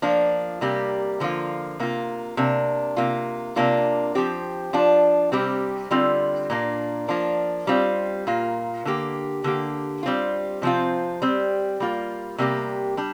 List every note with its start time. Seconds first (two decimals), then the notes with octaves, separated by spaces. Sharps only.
0.02 F3 A#3 D4 F4
0.61 C3 G3 A#3 G4
1.20 D3 F3 A#3 F4
1.80 C3 A#3 F4
2.37 C3 A#3 D4
2.97 C3 A#3 F4
3.56 C3 A#3 D4 F4
4.15 F3 C4 G4
4.73 F3 D4 F4
5.32 C3 G3 C4 G4
5.91 D3 G3 C4 F4
6.50 A#2 A#3 D4
7.09 F3 A#3 D4 F4
7.67 G3 C4 F4
8.27 A#2 A#3 F4
8.85 D3 A#3 G4
9.44 D3 A#3 G4
10.03 G3 C4 F4
10.62 C3 F3 C4 F4
11.22 G3 C4 G4
11.80 G3 A#3 F4
12.38 C3 G3 A#3 G4
12.97 G3 D4